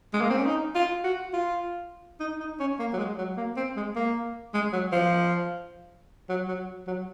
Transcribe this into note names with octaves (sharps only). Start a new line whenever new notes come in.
G#3
A#3
C4
C#4
D#4
F4
F#4
F4
D#4
D#4
C#4
A#3
F#3
G#3
F#3
A#3
C4
G#3
A#3
G#3
F#3
F3
F#3
F#3
F#3